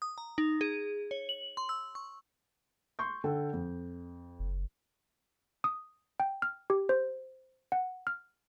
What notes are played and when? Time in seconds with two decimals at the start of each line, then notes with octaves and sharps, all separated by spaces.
0.02 D#6
0.18 A#5
0.38 D#4
0.61 G#4
1.11 C#5
1.29 F#7
1.57 C6
1.69 E6
1.95 C#6
2.99 C6 C#6 G6
3.24 D3 A4 G5
3.53 F2
4.39 F#1
5.64 D#6
6.20 G5
6.42 F6
6.70 G4
6.89 C5
7.72 F#5
8.07 F6